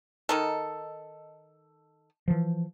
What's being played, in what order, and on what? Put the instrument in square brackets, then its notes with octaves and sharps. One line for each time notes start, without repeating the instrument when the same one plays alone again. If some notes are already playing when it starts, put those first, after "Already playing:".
[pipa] D#3 D#4 A4
[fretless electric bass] E3 F3